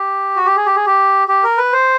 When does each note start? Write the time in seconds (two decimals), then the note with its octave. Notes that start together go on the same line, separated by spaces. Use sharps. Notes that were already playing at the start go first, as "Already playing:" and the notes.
Already playing: G4
0.36 F#4
0.45 G4
0.56 G#4
0.66 G4
0.76 G#4
0.86 G4
1.28 G4
1.43 A#4
1.57 B4
1.73 C5